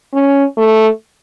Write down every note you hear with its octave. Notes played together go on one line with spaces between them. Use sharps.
C#4
A3